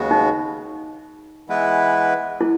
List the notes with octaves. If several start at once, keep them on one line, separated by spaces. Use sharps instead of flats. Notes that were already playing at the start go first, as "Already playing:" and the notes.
Already playing: D#2 C#3 G#3 B3 F#4
D#4
E3 G#3 B3 E4 B4
E4